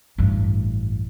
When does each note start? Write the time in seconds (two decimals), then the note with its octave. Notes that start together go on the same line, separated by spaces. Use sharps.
0.18 A1 G2